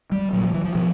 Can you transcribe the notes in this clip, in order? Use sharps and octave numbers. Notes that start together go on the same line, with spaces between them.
G3
A#2 F#3
F3
E3
F3
B2 F3